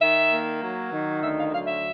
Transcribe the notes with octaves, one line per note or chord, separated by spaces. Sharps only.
D#3 E5
A#3
F#3
D#3
D2 E5
F5
F#3 F5
E5